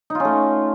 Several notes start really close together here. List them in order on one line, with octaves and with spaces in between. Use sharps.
D#4 F4 C#4 A3